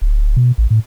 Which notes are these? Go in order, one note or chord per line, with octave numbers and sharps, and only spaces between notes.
D1
B2
A1
A2